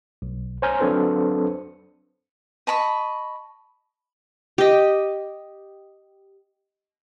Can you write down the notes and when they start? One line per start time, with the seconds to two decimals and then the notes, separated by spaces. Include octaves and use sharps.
0.22 B1
0.62 C5 C#5 G#5 A#5 F6 G6
0.79 F#3 C4 D4 A4 B4 C5
2.67 D#5 A5 B5 C#6
4.58 G4 D#5